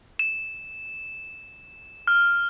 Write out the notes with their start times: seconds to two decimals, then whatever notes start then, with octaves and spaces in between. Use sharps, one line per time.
0.19 E7
2.07 F6